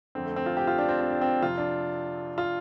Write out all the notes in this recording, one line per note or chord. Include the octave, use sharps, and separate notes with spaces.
F2 D3 C4
A3
C4
F4
G4
F4
D4
C4
C4
D4
C4
F2 C3 F4
D4
F4